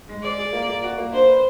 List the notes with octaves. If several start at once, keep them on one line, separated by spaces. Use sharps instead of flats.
G#3
G#4 D5
G#4
A#3
A#3
F#4
A#3
D4 C5
B4